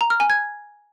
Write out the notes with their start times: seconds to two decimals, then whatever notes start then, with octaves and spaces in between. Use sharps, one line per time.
0.01 A#5
0.10 F6
0.20 G#5
0.30 G#6